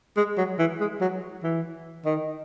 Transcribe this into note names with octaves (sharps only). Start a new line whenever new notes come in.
G#3
F#3
E3
G#3
F#3
E3
D#3